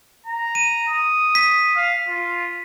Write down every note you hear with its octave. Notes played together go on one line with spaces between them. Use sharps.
A#5
D#7
D#6
B6
F5
F4